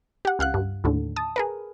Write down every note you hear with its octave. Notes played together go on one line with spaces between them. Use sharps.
G4 F#5
C#2 F5 F#5 F#6
G2
D#2 A2 D3
A5 D#6
G#4 A#4 B4